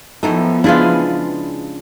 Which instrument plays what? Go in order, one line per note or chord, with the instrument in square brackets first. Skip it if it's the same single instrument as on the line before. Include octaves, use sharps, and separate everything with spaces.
[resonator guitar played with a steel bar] F#2 A2 D#4 [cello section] F3 B3 [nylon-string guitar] A4
[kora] C#3 G#3 F4 [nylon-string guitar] D4 [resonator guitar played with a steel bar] E4 G#4 B4